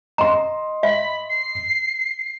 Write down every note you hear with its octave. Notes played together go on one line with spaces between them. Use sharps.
D#5 A#5 C6
E5 B5
C7